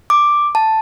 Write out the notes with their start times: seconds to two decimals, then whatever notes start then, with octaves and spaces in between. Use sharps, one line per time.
0.10 D6
0.55 A5